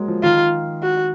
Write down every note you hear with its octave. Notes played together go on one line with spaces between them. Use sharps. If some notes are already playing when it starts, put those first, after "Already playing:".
Already playing: F#3 G#3 A#3
F3
D#3 F4
F#4